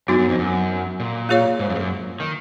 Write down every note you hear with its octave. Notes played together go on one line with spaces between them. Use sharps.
F#2 B3 D#4 F#4
F#2
F2
F#2
A#2
A#3 F4 G#4 C#5 F5
G#2
F#2
G#2
F#2
D#3